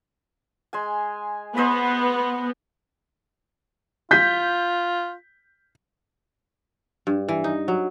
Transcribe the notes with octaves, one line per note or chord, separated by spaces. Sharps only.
G#3 G#5
B3 C5 D#5 B5
F4 G6 B6
G2
E3
D#4
F#3